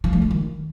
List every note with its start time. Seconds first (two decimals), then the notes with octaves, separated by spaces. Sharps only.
0.04 F3
0.13 A3
0.22 F4
0.31 D#3